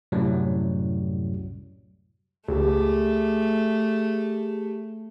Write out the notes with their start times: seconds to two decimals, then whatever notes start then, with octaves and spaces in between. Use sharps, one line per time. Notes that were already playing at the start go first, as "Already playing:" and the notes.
0.12 C2 F#2 A2 F#3 G3
2.48 C#2 A3 G4 G#4